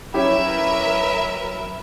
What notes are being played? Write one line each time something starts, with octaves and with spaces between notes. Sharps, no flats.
F#3 C#4 E4 G4 A#4 B4 E5 B5